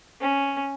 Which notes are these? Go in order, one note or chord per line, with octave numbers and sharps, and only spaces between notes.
C#4